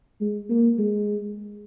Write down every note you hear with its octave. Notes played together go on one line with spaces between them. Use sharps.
G#3
A#3
G#3